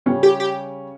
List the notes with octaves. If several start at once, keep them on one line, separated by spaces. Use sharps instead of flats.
C#3 G3 C#4
G4
G4